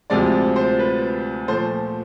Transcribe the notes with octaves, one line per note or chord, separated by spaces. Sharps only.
D2 C3 F3 G#3 D5
C5
B4
A#2 F3 A3 C5